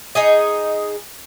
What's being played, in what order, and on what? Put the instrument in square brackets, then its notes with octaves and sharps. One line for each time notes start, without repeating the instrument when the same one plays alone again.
[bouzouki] D#4 G#4 D#5